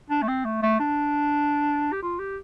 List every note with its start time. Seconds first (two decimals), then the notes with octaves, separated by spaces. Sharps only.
0.10 D4
0.22 A3
0.28 C4
0.45 A3
0.62 A3
0.80 D4
1.92 G4
2.02 F4
2.19 G4